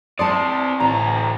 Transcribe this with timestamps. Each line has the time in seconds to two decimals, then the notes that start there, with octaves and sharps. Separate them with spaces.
0.19 C4 B4 C5 D5 A5 C6 D#6 C#7
0.80 A1 D2 A#5